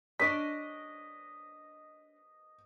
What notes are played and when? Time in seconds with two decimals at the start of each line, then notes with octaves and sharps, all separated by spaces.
0.20 C#4 D4 D5 D#5 B6